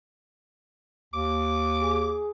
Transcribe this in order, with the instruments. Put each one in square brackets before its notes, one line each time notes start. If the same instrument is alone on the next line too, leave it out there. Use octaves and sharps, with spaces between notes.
[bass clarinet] D#2 [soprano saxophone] D6
[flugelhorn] G#4